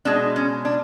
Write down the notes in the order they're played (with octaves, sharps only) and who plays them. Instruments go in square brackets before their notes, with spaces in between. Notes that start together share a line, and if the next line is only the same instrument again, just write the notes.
[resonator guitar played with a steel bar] B2 G#3 D4
C#4
D4